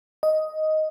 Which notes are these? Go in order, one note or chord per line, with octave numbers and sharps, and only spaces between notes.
D#5